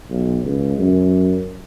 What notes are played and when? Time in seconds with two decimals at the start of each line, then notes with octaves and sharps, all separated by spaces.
0.10 B1
0.44 C#2
0.78 F#2